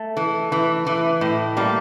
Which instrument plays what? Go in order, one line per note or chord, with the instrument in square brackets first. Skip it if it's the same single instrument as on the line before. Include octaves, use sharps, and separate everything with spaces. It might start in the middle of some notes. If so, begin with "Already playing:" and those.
Already playing: [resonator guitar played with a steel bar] A3
E3
E3
E3
A2
G3 A#3